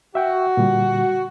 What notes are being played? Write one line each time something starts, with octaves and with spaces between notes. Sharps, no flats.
F#4 E5 G5
A#2 D3 G3